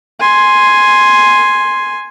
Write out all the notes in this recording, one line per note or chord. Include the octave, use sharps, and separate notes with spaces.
G#5 C6